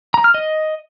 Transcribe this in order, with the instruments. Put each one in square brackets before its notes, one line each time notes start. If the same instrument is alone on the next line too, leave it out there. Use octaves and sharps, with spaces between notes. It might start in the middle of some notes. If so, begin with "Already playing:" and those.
[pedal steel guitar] A#5
F6
D#5